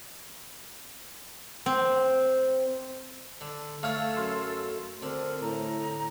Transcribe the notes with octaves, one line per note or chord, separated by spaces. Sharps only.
C4
D3
A3 A4 C#5 F5 F6
F#2 C6
D3 C4 A#4
A2 A#5